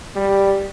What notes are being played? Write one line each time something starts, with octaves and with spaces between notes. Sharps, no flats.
G3